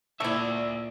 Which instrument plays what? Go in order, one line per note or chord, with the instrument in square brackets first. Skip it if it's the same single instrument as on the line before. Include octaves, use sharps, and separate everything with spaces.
[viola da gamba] A#2 [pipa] A3 E4 [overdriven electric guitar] D5 E5